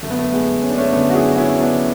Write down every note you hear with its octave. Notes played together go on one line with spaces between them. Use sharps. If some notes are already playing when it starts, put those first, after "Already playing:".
F#2 D3 A3
B3
A3
G#3 B3
C#4
D4
A3 C#4
F#2 D3 B3 D4
F#4
E4 G#4
F#4
C#4 E4
B3 D4